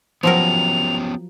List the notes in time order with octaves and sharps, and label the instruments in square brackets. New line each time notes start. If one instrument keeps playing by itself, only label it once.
[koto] F3 F#3 A#4 [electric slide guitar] B3 C#4 G4 [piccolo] F7